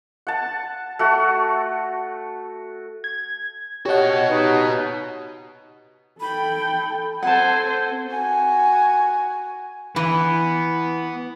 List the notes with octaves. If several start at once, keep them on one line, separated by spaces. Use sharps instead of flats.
F#5 A5
A3 F#4
G#6
F#4 G4 C#5 D#5 F#5
D#4 B4
A4 G5 B5
C4 A4 C5 F#5 G#5 A5
F#4 G#5
E3 B3